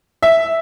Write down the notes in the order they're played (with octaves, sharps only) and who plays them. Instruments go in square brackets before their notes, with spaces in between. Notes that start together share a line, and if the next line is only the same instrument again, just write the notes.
[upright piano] E5